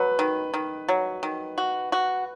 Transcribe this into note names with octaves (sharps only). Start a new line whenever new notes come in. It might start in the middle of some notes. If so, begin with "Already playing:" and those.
Already playing: F#3 B4
D#3
D#3
F#3
D#3
F#4
F#4